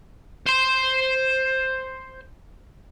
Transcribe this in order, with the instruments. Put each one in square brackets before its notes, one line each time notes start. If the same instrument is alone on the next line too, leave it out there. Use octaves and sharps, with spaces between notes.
[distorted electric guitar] C5 C6